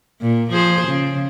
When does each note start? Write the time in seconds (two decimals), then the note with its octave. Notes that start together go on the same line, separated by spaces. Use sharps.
0.22 A#2
0.50 F3 G#4 C5
0.87 C#3